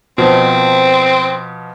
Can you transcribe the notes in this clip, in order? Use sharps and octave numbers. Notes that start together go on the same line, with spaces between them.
B2 F3 C4